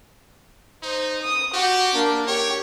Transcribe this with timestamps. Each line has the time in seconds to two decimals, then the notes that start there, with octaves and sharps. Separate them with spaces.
0.83 D#4 C5
1.22 D#6
1.54 F#4 G4
1.95 A#3 D4
2.27 G4 C#5